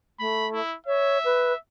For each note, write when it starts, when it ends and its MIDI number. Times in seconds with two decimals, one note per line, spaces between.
0.20 0.61 57
0.20 0.48 83
0.53 0.76 64
0.87 1.18 73
0.87 1.58 76
1.24 1.53 71